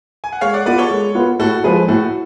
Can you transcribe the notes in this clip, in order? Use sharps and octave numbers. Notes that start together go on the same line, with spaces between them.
G#5
F#5
G#3 C#5 F5
D5 F#5
B3 F4 B4 D5
A4 C#5
G#3
B3 F4
A2 F#4 A4
F3 G#3 G#4 B4
A2 F#4 A4